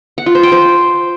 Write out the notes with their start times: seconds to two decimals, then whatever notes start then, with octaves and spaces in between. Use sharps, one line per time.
0.18 F#5
0.26 F4
0.35 C5
0.43 G5
0.52 C5